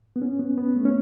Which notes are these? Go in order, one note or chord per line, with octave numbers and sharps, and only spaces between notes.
B3
C#4
B3
B3
A3
C#4